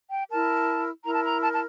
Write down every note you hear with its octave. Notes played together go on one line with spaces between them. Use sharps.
G5
E4 A#4 A5
E4 A#4 A#5
A5
A#5
A5
A5